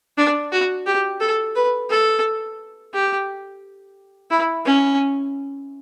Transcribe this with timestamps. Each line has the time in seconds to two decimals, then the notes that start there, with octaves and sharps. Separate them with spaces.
0.17 D4
0.52 F#4
0.86 G4
1.20 A4
1.56 B4
1.90 A4
2.93 G4
4.31 E4
4.66 C#4